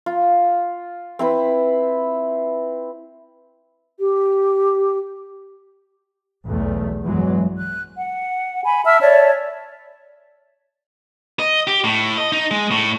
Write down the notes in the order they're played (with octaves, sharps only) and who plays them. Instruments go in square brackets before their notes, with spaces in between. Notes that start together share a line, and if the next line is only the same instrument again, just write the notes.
[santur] F4
C4 E4 B4
[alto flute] G4
[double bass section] B1 E2 A3
E2 G2 E3 F#3 G#3
[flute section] F#6
F#5
G#5 B5
E5 A5 E6 F6
C#5 D5 E5 A5
[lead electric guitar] D#5
G4
A2
D#5
D#4
G#3
A2